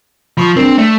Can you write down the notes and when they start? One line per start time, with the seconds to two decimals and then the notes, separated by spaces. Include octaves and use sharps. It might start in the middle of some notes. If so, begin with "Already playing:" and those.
0.37 F3 B5 C#6 D#6
0.56 G#3 C4 D4 A#4
0.78 A3 D5